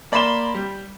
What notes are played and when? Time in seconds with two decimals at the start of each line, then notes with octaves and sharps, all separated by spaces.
0.12 A#3 D5 B5 C6 E7 G7
0.54 G3